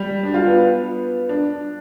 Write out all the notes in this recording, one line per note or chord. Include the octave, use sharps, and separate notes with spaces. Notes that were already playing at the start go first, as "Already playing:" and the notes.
Already playing: G3
D4
F4
B3
D4